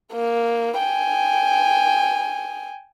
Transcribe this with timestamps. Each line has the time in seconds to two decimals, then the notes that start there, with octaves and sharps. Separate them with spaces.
0.13 A#3
0.79 G5 G#5